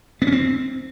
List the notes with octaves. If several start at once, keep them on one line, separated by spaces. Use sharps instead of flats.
B3
C#4
C4